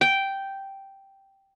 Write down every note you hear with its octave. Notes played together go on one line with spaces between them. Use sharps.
G5